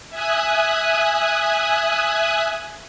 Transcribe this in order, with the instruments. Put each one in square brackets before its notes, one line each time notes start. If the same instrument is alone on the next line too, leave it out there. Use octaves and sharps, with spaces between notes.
[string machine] E5 G#5 D#6 F#6